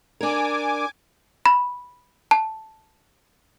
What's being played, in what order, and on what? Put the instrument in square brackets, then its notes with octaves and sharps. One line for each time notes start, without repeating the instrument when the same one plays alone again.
[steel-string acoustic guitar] D4 A#4 [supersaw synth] G#5 D6
[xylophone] B5
A5